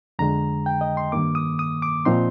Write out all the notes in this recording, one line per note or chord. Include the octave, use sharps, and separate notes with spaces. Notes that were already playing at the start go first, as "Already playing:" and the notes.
F2 D3 G#3 A#5
G5
D#5
C6
G2 D#3 A#3 D6
D#6
D#6
D6
A#2 F3 C4 D#4 C6